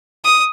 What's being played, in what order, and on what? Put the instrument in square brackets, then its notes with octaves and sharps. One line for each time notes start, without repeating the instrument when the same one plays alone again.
[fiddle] D#6